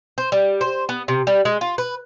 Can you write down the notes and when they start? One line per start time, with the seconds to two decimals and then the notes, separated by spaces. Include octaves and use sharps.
0.18 C5
0.32 G3
0.61 C5
0.89 B3
1.08 C3
1.27 G3
1.45 G#3
1.61 F4
1.78 B4